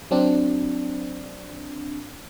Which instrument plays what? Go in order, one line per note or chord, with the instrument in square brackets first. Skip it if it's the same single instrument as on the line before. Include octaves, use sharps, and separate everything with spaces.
[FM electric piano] F#3 C4 D4